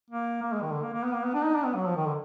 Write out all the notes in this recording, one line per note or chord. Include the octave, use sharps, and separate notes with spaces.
A#3
A#3
G#3
D#3
D3
A#3
A#3
B3
A#3
B3
D4
D#4
D4
B3
F#3
F3
D#3
D3